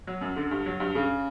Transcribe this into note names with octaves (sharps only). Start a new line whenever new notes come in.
F#3
F#2
D3
G2
F#3
G2
C#3